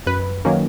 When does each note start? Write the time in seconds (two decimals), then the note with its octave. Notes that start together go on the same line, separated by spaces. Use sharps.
0.06 F#2 B4
0.45 D#3 F#3 A#3 C#4